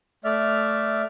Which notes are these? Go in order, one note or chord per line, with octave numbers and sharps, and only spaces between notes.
A3 D5 E5 F6